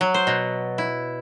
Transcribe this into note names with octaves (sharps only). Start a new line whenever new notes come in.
F#3
C5
B2
E4